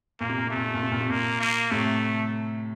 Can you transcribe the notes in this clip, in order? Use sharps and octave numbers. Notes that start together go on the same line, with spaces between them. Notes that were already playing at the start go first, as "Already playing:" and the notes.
A#2 A#3
C3
A#2
C3 A3
A#2
C3
A#2
C3
A#2
C3
A#2 A#3
A#3
A2 C3 A3